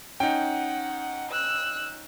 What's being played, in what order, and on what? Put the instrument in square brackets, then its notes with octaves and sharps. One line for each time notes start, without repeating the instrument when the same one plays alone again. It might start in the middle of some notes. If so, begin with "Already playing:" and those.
[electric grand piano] C#4 D#4 [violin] F#5 [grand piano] G5
[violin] E6 F#6